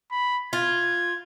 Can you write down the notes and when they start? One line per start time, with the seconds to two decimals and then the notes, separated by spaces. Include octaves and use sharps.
0.11 B5
0.53 F4 G#6